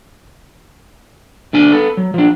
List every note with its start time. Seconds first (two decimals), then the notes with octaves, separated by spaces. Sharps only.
1.53 D2 D4 G#5
1.72 B3 A4
1.97 F#3
2.14 F3 D4